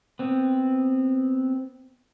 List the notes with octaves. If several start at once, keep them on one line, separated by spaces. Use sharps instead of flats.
B3 C4